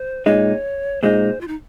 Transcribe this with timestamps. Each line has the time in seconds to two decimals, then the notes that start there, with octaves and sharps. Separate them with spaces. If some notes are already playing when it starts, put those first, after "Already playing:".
Already playing: C5
0.25 A#2 G#3 D#4 C#5
1.02 A#2 G#3 D#4 C5
1.41 F4
1.48 D#4